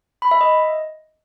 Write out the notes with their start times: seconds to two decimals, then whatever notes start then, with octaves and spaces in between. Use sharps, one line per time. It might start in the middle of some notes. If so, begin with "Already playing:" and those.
0.22 B5
0.31 E5
0.41 D#5